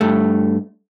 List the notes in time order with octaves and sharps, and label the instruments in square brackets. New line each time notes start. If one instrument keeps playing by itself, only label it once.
[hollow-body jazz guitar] G2 A3